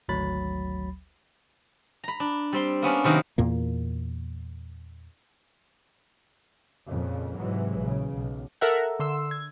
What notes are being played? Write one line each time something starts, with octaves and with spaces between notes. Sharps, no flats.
G#1 D2 F#3 B5 A6
A#5 B5
D4
G3 C4 C6
A#3 B3 C#4 D4
C3 D#3 F#3 A#3
E2 A#2 A#3
F2 A#2 C#3
G#2 C3 E3 F#3 G#3
A#1 C#3
B1
A4 A#4 E5 F#5
D3 C6 E6
G#6